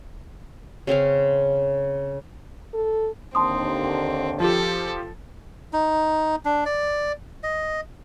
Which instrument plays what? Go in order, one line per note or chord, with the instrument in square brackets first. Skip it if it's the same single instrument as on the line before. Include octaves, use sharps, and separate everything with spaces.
[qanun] C#3 C4 C#4 F5
[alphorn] A4
[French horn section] D#2 D3 [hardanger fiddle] C4 [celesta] A5 C6 D#6
[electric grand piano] F3 F4 G4 [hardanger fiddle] A4
[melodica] D#4
D4
D5
D#5